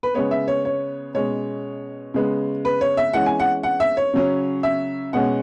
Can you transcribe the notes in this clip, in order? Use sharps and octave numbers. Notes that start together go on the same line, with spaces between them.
B4
C#3 G#3 B3 C#5
E5
C#5
C#5
B2 G#3 C#4 C#5
C#3 G#3 B3
B4
C#5
E5
E3 G#3 C#4 F#5
G#5
F#5
F#5
E5
C#5
C#3 F#3 C#4
E5
B2 G#3 C#4 F#5